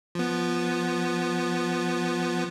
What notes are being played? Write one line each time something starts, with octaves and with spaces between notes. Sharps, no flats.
F3 B3